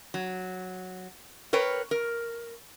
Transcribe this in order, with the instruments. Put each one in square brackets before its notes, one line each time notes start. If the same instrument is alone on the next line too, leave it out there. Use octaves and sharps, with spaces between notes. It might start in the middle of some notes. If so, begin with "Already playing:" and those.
[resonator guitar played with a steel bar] F#3
A#4 B4 C#5 G5
A#4